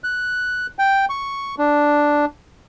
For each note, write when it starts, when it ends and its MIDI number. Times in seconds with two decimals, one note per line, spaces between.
0.04 0.66 90
0.79 1.05 79
1.10 1.55 85
1.58 2.25 62